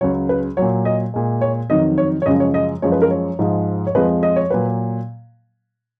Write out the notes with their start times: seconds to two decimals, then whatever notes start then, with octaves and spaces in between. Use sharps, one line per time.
0.01 C#2 C#3 F#3 C#5
0.29 B4
0.57 A#2 F#3 C#5
0.85 D#5
1.14 A#2 G#3
1.41 C#5
1.70 F2 D#3 F#3 D#5
1.98 C#5
2.22 C#5
2.26 F#2 C#3 F3 G#3 D#5
2.40 C#5
2.54 D#5
2.82 F#2 F3 G#3 C#5
2.92 B4
3.02 A#4
3.11 C#5
3.39 G#2 F3 G#3
3.87 C#5
3.95 F2 F3 G#3 B4
4.23 D#5
4.36 C#5
4.51 A#2 F#3 B4